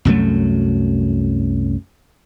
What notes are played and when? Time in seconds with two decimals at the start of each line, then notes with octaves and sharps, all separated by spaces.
0.05 C2 F#2 F#3 A3